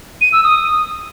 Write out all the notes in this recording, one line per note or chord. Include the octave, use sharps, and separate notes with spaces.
D#7
E6
D#6